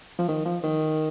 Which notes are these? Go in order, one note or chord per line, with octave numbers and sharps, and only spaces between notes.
F3
D#3
F3
D#3